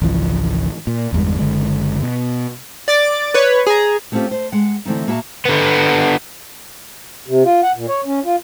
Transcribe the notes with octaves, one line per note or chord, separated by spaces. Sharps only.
G#1 C#2 E3 F3
A#2
G1 E2 G3 G#3
F#1 D3 G#3
B2
D5 D6 A6
B4 C#5
G#4 A#5
G3 A3 C4 C#4 F4 G4
C5
G#3 F#5
D3 E3 A3 C4 D#4
A#2 A#3 F#4 E5 A5 A#5
D3 B3
C3
F4
F#5
A#2
C#5
C#4
F4